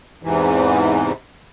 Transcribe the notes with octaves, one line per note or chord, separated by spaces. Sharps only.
E2 G#2 C3 E3